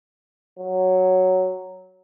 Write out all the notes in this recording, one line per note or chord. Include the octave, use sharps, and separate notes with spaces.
F#3